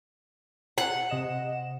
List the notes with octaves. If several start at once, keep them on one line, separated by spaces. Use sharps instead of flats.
F#5
C3 D#5 E7